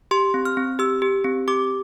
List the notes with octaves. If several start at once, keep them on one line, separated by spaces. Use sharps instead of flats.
G4 C6
C4
F6
C4
G4 E6
G4
C4
G4 D6